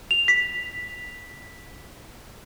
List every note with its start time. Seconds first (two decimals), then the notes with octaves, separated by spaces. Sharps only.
0.11 F7
0.28 B6